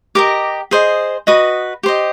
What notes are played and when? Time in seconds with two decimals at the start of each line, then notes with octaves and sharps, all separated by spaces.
0.15 G4 A#4 D#5 D6
0.71 G#4 C5 D#5
1.27 F#4 B4 D#5 D#6
1.83 G4 C5 D#5